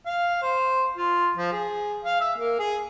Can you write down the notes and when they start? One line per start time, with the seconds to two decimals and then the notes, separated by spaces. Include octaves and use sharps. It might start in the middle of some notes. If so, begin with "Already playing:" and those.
0.06 F5
0.42 C5
0.97 F4
1.37 F3
1.53 G#4
2.05 F5
2.20 E5
2.38 A#3
2.59 G#4